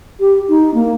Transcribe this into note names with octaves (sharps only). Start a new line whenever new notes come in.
G4
D#4
A#3